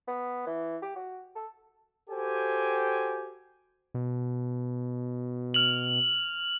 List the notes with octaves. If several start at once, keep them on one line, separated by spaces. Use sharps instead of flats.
B3
E3
G4
F#4
A4
F#4 G4 A4 C5 G5 G#5
B2
F6 F7 F#7